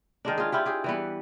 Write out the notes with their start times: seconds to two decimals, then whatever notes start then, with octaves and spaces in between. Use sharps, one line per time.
0.25 D#3 G#3 D4
0.38 F4 G#4
0.52 E4 F4 G4
0.66 G4 G#4
0.84 E3 G3 B3